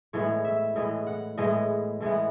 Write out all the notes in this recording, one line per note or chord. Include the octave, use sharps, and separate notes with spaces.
A2 E3 G#3 B3 C#5
E5
A2 E3 G#3 B3 D#5
F#5
A2 E3 G#3 B3 D#5
A2 E3 G#3 B3